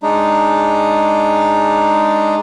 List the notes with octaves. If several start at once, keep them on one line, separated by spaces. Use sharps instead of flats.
G#3 D4 D#4